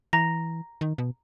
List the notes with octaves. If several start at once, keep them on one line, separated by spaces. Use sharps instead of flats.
E3 A#5 A#6
D#3
B2